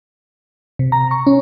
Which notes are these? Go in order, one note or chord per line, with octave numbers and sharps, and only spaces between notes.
C3
A#5
C#6
C#4